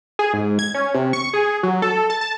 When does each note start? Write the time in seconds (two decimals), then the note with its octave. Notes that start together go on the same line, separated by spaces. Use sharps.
0.19 G#4
0.33 G#2
0.59 G#6
0.74 C#4
0.94 C3
1.13 C#6
1.33 G#4
1.63 F#3
1.82 A4
2.10 A5
2.21 A5